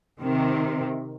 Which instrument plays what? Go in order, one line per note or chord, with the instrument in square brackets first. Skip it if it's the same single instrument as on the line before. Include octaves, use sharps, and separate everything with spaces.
[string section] C3 D#3